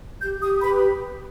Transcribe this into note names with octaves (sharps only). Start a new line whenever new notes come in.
G4 G6
G4 D#6
B4 B5